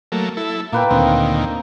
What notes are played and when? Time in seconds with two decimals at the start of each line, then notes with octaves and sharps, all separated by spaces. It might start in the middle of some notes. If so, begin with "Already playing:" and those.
0.12 F#3 A3 A#3
0.37 E4 A4
0.72 A#2 A#3 B4 G5
0.90 D2 A#2 D#3 C4